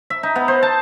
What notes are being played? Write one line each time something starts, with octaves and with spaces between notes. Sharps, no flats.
E5
D#4
B3
C5
A5